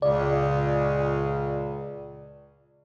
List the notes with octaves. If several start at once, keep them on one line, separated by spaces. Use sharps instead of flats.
C#2 A#2 C#3 D5